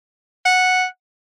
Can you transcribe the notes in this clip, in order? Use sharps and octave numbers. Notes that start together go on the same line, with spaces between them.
F#5